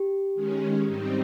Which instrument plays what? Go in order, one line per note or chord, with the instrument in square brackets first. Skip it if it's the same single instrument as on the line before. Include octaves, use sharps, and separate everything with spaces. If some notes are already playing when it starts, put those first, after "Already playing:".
Already playing: [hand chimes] G4
[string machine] D#3 G#3 C#4
G#2 G3 C4 D#4